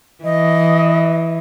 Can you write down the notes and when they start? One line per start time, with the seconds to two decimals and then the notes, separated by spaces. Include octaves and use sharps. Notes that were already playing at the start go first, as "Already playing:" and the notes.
0.24 E3 D#5